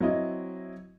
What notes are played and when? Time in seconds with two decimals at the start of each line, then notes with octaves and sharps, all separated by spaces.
0.01 F#3 C4 E4 D#5